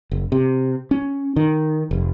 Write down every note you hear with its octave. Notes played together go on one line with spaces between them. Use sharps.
F#1
C3
C#4
D#3
F1